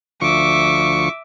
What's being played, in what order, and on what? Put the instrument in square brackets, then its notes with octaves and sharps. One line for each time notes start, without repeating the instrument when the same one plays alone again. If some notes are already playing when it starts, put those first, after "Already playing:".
[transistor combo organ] D2 F3 C#6 [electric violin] E5 D6